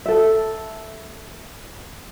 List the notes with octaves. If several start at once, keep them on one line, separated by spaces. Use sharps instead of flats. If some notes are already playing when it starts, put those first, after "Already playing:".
A4 E5